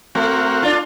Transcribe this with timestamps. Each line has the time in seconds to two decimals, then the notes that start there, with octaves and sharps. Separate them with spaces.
0.15 A3 C4 F#4 A#4
0.63 D4 F4